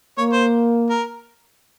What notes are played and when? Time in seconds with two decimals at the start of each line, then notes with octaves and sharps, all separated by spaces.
0.18 A#3 C#5
0.32 C5
0.90 A#4